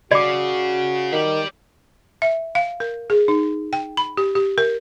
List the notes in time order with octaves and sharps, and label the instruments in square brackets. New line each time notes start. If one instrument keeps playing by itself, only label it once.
[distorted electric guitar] C#3 [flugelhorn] F#4 [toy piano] D5 D6
[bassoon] D#3 [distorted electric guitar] G4 D5
[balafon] E5
F5
A#4
G#4
D#4
G5
B5
G4
G4
A#4